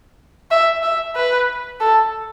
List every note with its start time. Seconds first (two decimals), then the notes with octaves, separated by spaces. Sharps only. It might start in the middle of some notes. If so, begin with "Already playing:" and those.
0.51 E5
0.83 E5
1.16 B4
1.80 A4